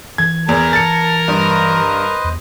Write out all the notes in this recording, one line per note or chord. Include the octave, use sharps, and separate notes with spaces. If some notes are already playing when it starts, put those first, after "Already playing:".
E3 G#6
E2 A#4 A#5
A5 A6 C#7
G2 B4 C5 D#5
E2